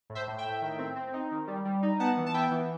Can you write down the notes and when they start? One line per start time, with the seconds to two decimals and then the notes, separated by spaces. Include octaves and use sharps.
0.10 A2
0.15 C5 E5
0.28 A2
0.38 E5 G5
0.44 A2
0.61 D#3
0.79 C4
0.96 C4
1.13 D#4
1.31 D#3
1.48 G3
1.65 G3
1.83 D#4
2.00 B3 F#5 A5
2.17 E3
2.26 A5
2.34 B3 E5 G5
2.51 E3